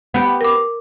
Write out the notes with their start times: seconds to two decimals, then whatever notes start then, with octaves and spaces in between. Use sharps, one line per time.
0.14 B3 G4
0.41 A#4 D6